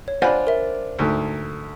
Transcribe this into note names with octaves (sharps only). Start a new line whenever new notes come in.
C#5
D4 F4 C5 D5 F#5 G#5 B5
A#4 E5
D2 G#2 A3